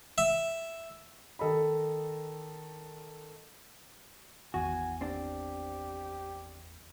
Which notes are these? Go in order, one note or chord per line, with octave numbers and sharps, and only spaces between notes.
E5
D#3 A4 D#5 B5
G#1 E2 F#4 G#5
C4 D4 G4